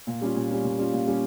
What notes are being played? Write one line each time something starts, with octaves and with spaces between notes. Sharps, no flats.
A#2
G3 C#4 F4
A#2
G3 C#4 F4
A#2
G3 C#4 F4
A#2
G3 C#4 F4